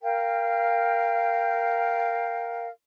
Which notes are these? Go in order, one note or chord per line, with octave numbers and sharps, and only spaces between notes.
A#4 F5 G5